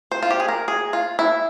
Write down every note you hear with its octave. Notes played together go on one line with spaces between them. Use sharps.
C5
F4
G4
G#4
A#4
G#4
F4
E4